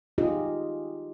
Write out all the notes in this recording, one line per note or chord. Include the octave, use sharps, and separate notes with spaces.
D#4 F4 G4 G#4 D#5